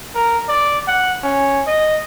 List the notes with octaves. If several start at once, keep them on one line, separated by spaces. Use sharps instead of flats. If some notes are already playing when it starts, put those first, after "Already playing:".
A#4
D5
F#5
C#4
D#5